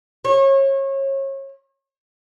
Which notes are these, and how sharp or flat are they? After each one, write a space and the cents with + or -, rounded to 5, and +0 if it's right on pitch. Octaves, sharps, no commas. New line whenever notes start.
C#5 -30